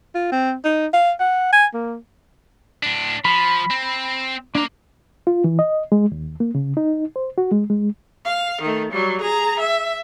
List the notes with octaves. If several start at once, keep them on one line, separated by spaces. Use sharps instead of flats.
F4
C4
D#4
F5
F#5
G#5
A#3
A2 D4
F3 B5
C4
A#3 D4 A#5
F4
E3
D#5
G#3
D#2
A#3
C#3
D#4
C5
F#4
G#3
G#3
F5
D#3 A3
F#3 G3
G#4 A#5
E5